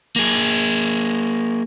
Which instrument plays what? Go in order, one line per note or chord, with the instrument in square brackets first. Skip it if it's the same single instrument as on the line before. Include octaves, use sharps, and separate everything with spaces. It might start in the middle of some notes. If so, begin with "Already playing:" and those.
[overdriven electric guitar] A#3 G#4